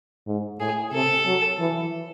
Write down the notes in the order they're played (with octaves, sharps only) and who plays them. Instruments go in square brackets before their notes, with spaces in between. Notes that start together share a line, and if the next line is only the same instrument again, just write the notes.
[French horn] G#2
[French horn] A2 [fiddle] G#4
[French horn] C3 [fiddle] A4
[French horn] F#3
E3